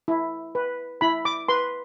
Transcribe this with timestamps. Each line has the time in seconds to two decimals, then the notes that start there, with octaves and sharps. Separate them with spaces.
0.08 E4
0.55 B4
1.01 E4 B5
1.25 D6
1.48 B4 C6